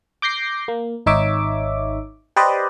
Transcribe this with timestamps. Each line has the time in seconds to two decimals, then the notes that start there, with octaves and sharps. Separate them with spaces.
0.22 D6 G6 A#6 C7
0.68 A#3
1.06 G#1 D#4 C#5 E5 D6
2.36 G4 B4 C5 D5 D#5